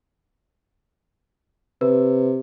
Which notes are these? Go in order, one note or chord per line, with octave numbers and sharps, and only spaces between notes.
C3 B4